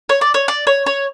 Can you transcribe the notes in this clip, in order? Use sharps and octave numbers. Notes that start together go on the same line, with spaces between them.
C#5
D5
C#5
D5
C#5
C#5